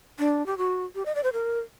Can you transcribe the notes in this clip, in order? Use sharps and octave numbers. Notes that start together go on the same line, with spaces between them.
D4
G4
F#4
G4
D#5
D5
C5
A#4